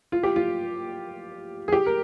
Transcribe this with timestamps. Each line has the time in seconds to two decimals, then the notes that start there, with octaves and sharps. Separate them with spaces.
0.12 F4
0.23 G4
0.36 F4
1.68 G#4
1.72 G4
1.86 A#4